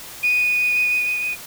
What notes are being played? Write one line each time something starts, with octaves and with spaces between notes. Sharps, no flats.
D#7